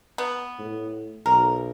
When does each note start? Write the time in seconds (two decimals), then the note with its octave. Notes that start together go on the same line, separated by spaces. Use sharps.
0.18 B3
0.59 A2
1.26 B1 A#4